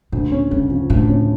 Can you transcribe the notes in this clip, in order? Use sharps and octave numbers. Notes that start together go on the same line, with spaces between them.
D2 A#2
C#4
G2 C#3
F3
D2 A2
C#4